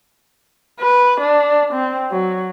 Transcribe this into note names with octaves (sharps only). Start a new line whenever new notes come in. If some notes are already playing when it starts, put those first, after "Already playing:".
B4
D4
C4
F#3